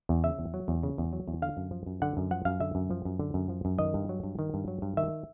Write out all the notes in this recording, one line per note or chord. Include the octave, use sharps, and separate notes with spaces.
E2
C#3 E5
E2
F#3
E2
C#3
E2
F#3
E2
D3 F5
F#2
F3
F#2
D3 F#5
F#2
F3 F#5
F#2 F5
D3 E5
F#2
F3
F#2
D3
F#2
F3
F#2
D#3 D#5
G2
F#3
G2
D#3
G2
F#3
G2
D#3 E5